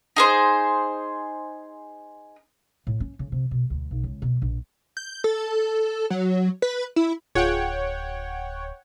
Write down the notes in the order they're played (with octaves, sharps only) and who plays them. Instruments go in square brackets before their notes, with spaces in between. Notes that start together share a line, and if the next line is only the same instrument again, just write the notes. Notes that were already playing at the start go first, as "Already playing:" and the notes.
[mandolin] D#4 G#4 C5
[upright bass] A2
C#4
C#3
C3
B2
D2
B1
C#2
B2
A#1
[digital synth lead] G6
A4
F#3
B4
E4
[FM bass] D1 [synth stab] F4 G#4 [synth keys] C#5 F#5 G5